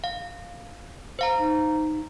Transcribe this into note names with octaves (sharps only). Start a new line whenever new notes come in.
F5
C5 F5 A#5
D#4